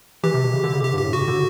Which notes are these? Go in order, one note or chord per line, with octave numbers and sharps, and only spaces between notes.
E3 G4
C3
B2
C#3
D3
C#3
B2
C3 G4
G2
A2 G4
C#3 F#4
D3